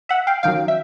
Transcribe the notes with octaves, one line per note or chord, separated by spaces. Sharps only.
E5 F#5
F5 G5
F#2 D#3 F#3 F5 G5
E5